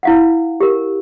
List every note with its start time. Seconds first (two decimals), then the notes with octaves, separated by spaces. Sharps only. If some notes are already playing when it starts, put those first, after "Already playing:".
0.03 E4 F5 F#5
0.60 G4 A#4